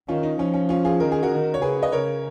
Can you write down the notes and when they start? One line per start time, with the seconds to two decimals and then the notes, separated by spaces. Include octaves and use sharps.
0.08 D#3 C#4 F4
0.23 D#4
0.39 F3 C#4
0.54 C#4
0.69 C#4 F4
0.85 F4 G#4
1.00 D#3 A#4
1.12 G#4
1.23 F#4 A#4
1.30 D#3
1.54 C#5
1.61 C#3 G#4 B4
1.82 B4 D#5
1.92 C#3 A#4 C#5